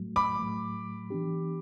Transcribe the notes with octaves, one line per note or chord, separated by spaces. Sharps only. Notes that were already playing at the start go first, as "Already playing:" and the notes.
Already playing: A2 F#3 A3
B5 D6
A2 F#3 A3
E3 B3 D4 G4